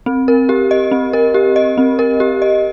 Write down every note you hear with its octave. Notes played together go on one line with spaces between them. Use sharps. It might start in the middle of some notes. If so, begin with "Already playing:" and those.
C4
A#4
G4
D#5
C4
A#4
G4
D#5
C4
A#4
G4
D#5